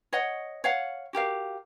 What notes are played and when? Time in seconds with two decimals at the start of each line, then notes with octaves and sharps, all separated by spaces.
0.13 C#5 D#5 F#5
0.64 C#5 F5 F#5
1.13 F#4 G4 A#4 F5